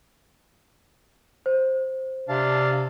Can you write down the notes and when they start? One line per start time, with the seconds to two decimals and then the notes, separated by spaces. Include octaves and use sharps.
1.46 C5
2.29 C3 D4 F5 A5